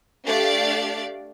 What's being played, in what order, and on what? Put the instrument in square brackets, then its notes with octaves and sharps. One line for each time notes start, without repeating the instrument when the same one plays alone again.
[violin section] A3 D4 G4 D5 F5 A6